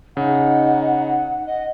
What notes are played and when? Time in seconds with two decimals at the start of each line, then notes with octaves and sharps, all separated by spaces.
0.17 C#3 D#4 F#5
1.46 D#5